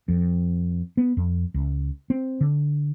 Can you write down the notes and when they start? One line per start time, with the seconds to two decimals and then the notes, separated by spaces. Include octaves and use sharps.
0.08 F2
0.97 B3
1.17 F2
1.54 C#2
2.10 C4
2.41 D3